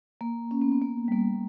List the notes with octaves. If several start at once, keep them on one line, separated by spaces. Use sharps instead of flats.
A#3
C#4
B3
B3
A#3
G3
A#3